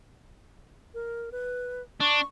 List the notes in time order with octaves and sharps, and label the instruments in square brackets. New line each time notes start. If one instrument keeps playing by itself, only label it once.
[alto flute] A#4
B4
[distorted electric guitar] D4 [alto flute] C#6